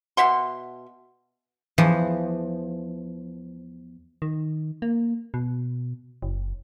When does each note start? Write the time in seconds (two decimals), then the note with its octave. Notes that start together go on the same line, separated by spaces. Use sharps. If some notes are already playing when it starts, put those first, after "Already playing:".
0.17 B2 E5 F#5 C6
1.78 E2 E3 F3
4.22 D#3
4.82 A#3
5.34 B2
6.22 F#1